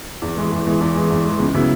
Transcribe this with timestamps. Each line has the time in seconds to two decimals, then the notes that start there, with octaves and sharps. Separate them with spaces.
0.22 E2
0.37 E3 G#3
0.52 E2
0.67 E3 G#3
0.81 E2
0.96 E3 G#3
1.11 E2
1.26 E3 G#3
1.40 C#2
1.54 C#3 F#3 B3 E4